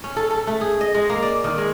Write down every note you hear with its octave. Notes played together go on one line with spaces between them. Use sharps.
C#4
A4
A4
A3
G#4
D#5
G#3
A#3
D5
D#3
G#3